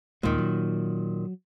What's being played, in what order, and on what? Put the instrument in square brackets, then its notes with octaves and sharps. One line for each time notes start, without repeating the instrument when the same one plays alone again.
[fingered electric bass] D#2 G#3 [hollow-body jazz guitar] A#2 D#3
[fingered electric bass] F#3